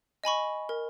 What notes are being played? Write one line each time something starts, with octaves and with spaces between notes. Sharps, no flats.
D#5 G#5 B5 C#6
A#4